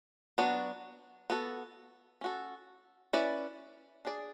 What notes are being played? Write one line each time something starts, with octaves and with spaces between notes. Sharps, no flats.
F#3 B3 D4 F#4
B3 F#4 A4
C#4 F#4 A4
C#4 E4 B4 D5
D4 G#4 D5